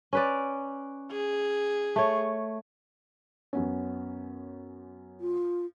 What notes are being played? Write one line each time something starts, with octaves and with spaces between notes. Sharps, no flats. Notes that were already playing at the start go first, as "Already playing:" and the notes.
C#4 B4 D5
G#4
A3 C#5
F#2 B3 C#4
F4